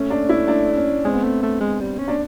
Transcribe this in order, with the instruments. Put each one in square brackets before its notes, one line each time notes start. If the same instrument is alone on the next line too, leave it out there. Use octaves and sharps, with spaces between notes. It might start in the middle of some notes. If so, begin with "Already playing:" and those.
Already playing: [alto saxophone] A3 [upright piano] C#4
[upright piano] D4
E4
D4
C#4
[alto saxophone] G#3 [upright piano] C4
[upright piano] B3
[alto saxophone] A3 [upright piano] C4
[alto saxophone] A3
G#3
G3
C#4
[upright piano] D4